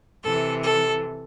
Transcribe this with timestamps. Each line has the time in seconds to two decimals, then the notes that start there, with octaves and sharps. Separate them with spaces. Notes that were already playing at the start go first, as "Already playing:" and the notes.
0.24 C3 E3 A4
0.64 A4